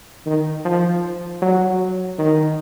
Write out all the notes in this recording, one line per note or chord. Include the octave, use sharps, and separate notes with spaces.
D#3
F3
F#3
D#3